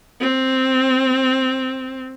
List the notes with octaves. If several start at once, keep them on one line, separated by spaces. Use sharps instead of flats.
C4